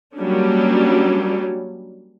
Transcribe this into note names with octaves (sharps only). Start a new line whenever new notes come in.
F#3 G3 A#3 C#4 D4